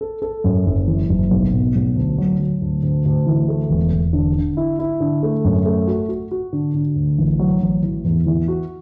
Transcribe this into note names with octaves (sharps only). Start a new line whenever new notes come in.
A4
A4
F#2
F#1
E3
F#1
B1
B2
B1
D2
F#3
F#3
D2
D2
D2
E3
A3
E1
E1
D3
D3
E4
E4
D3
A3
F#2
A3
F#4
F#4
F#4
D3
D3
D2
A1
F#3
A1
E3
E2
E3
F#4